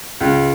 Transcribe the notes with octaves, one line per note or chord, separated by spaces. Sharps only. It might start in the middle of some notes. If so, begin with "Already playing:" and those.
C#2